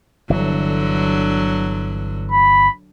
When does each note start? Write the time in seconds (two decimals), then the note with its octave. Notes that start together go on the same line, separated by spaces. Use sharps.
0.30 G1 D3 E3 F#3
2.32 B5